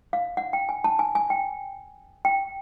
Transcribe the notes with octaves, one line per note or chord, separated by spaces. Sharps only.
F5
F#5
G5
G#5
A5
G#5
G#5
G5
G5